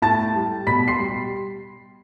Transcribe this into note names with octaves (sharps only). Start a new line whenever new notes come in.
A2 A5 A6
G3
B2 B5 B6
C6 C7
G3